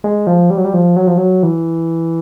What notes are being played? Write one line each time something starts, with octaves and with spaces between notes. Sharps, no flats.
G#3
F3
G3
F#3
G3
F3
F#3
F3
F#3
E3